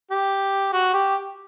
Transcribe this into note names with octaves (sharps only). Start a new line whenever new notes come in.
G4
F#4
G4